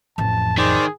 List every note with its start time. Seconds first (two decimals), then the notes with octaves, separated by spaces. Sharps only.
0.18 A1 F2 A5
0.58 D#3 G#4 C5 D5